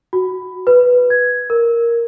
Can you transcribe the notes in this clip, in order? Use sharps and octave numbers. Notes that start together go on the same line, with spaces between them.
F#4
B4
G#6
A#4